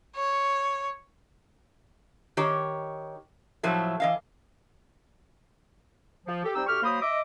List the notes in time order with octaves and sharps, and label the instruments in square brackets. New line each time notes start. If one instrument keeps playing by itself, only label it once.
[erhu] C#5
[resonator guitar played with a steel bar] D#3 G4 C#5
A2 F3 F#3 A3
E3 D#5 F5
[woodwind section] F3
G4 A4
G3 C4 D#4 C5 G5 E6
D2 G4 C#6 F6
F#3 A#3 C5 B5 D#6
D#5 E5 D6